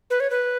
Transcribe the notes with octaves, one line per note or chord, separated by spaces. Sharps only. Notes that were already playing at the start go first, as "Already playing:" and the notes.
B4
C#5
B4